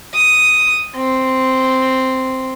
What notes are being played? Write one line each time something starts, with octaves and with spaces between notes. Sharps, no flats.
D#6
C4